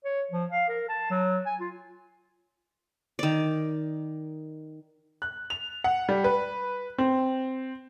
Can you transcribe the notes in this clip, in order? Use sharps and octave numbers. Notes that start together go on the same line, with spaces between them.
C#5
F3
F5
A#4
A5
F#3
G#5
F4
D#3 D5
F#6
F7
F#5
G3
B4
C4